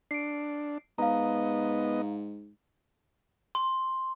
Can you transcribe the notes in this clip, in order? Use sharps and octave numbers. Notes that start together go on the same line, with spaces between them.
D4 C7 D7
G#2 B3 D#5 F5 A#5
C6